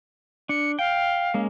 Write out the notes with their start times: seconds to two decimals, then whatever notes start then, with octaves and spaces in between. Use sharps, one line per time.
0.49 D4 C#7
0.79 F5 G5
1.34 G#3 A#3 C#4